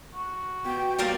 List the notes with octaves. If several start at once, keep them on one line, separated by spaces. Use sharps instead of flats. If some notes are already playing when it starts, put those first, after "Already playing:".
F#4
B2 G5
G3 A#3 F4